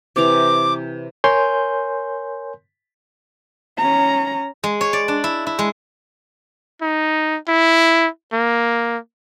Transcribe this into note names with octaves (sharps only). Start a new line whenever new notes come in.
C3 E3 A#5 D6
A#4 C#5 G#5 C6 G6
C#4 A#5
G#3
C#5
D5
D4
E4
E4
G#3
D#4
E4
A#3